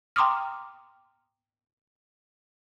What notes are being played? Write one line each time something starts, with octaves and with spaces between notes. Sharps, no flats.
G5 A#5 C6 D6 D#6 F6